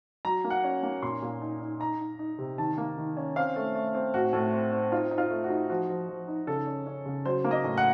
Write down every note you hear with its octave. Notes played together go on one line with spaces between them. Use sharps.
F#3 A#5
A#3
F#5
C#4
A#3
A#2 C6
A#2
D#4
D#4
D#4 A#5
D#4
D#4
C3
D#3 A5
A#3
D#3
C#4
C4 F5
A3
A3
C4
A2 F#4
A2
C4
C4
D#4 F4
D#4
F4
A3
F#4
D#4
F3 F#4
F3
F3
D#4
C#3 A4
C#4
C#4
C#3
F#3 C5
A#3
D#5
A2
F#5